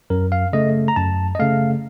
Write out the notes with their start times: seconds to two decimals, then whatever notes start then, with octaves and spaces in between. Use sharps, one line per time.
0.10 F#2 A#4
0.32 F5
0.53 C#3 A3 D#5
0.88 A#5
0.96 F#2 A5
1.35 D#5
1.39 C#3 A3 F5